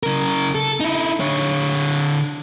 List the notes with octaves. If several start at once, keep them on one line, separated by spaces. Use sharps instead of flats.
C#3 A#4
A4
D#4 E4
D3 C#5